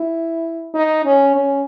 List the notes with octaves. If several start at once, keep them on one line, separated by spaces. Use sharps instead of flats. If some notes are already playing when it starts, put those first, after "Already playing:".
Already playing: E4
D#4
C#4
C#4